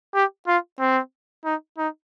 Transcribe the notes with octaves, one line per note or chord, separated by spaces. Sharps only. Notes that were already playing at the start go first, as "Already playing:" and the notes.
G4
F4
C4
D#4
D#4